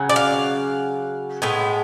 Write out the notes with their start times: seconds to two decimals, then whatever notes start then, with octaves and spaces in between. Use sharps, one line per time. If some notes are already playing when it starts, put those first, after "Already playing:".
Already playing: C#3 F#3
0.09 D5
0.16 F5
1.42 A2 G#3 B3